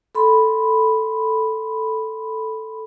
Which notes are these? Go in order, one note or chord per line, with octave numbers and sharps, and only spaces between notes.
A4 B5 C6